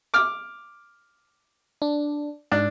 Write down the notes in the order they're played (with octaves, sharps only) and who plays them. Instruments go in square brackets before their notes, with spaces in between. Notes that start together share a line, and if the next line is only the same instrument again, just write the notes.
[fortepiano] D6 F6
[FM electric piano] D4
[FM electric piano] G#2 [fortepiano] D4